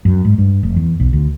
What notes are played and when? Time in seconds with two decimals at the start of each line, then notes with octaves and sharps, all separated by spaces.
0.05 F#2
0.25 G#2
0.38 G2
0.63 F1
0.76 E2
1.00 B1
1.13 D2